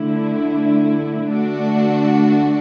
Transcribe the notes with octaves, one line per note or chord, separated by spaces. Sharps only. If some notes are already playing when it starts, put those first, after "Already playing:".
Already playing: D3 A3 E4
D3 A3 D4 F#4